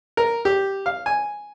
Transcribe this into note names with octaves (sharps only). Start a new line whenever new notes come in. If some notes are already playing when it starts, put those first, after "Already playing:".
A#4
G4
F5
G#5